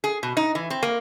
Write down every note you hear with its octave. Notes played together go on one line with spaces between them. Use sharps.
G#4
B2
D#4
E3
C4
A#3